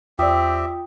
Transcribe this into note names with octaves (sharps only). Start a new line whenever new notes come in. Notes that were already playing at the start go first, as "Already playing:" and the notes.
E2 C4 F4 G4 D5 E5 G5 D#6